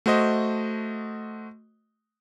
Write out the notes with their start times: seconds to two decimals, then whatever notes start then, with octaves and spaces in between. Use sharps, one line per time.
0.06 A3 F#4 C5 D#5